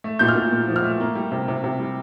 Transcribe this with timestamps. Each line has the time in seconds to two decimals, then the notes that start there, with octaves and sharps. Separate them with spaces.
0.04 A3
0.19 A#2 G6
0.28 F6
0.36 A#2
0.52 A#2
0.68 F3
0.76 F6
0.84 A3
1.00 A#3
1.15 G3
1.31 C3
1.48 C3
1.64 C3
1.79 G3